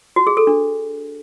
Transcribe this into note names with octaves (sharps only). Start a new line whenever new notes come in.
F#4
G#4
A4
D4